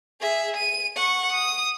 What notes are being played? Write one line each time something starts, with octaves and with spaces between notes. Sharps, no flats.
G#4 E5
D#7
F#5 C#6
D#6